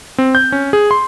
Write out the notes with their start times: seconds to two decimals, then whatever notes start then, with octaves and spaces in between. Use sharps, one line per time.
0.18 C4
0.35 G6
0.52 C#4
0.73 G#4
0.91 C6